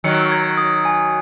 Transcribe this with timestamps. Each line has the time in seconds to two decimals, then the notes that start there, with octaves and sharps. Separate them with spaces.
0.04 D#3 F#3 C#7
0.32 G#6
0.57 D#6
0.85 G#5